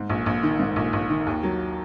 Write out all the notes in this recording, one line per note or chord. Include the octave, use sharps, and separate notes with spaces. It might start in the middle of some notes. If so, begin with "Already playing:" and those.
Already playing: G#2
A#1
A#1
D#3
G#2
A#1
A#1
D#3
D#2
F#3